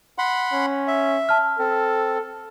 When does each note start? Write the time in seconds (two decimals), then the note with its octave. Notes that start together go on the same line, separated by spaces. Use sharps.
0.18 F#5 B5 C6
0.53 C#4
0.88 E5
1.29 A5 F6
1.59 C4 A4